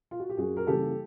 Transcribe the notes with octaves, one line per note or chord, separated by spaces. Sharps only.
F4
F#4
G4
F#2 F#4 G#4
A#4
C#3 E3 G3 A#3 G4 A4